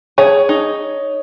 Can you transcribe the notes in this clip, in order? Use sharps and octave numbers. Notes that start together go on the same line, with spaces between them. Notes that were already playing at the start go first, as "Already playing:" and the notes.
G#4 C#5
D#4